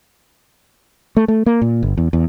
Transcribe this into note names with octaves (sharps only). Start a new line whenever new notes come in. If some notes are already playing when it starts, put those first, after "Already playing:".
A3
A3
A#3
A#2
G1
E2
E2